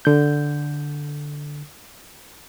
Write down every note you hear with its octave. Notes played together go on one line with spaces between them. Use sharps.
D3 G6